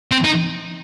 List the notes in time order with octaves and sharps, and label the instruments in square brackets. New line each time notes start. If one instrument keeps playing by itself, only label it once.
[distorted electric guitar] C4
D#4